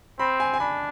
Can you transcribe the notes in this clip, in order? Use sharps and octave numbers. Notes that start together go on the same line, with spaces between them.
C4 B5
G#5
G#5
D4 B5